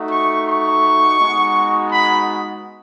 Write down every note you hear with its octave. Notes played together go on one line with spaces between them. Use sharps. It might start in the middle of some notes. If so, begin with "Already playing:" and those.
Already playing: A3 D#4 F#4
C#6
C#6
G#3 B3 D#4 F#4
B5